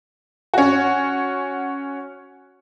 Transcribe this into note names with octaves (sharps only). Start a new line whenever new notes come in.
C#4 F#4